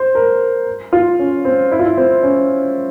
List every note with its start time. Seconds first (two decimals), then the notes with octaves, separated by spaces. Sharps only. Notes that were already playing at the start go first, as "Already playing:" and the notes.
Already playing: C5
0.15 A#4
0.93 F4
1.19 C#4
1.45 C4
1.72 E4
1.79 F4
1.86 E4
1.97 C4
2.23 C#4